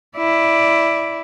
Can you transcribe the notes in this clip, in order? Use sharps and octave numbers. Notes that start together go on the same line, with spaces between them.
E4 D5